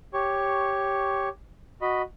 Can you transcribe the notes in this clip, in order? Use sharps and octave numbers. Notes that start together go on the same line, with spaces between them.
G4 C#5 C#6
F#4 D#5 B5